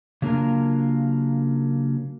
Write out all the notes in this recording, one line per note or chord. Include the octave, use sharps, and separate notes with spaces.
C#3 F#3 A#3 D4 F4 A#4